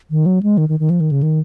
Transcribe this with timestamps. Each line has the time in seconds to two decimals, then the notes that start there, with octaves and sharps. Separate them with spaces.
0.11 D#3
0.26 F#3
0.43 G#3
0.57 D#3
0.69 D#3
0.80 D#3
0.90 F3
1.00 D#3
1.11 C#3
1.23 D#3